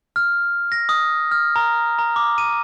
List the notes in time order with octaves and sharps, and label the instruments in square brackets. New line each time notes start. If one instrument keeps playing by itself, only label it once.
[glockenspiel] F6
A#6
D#6
F6
A#5
A#5
D6
D#7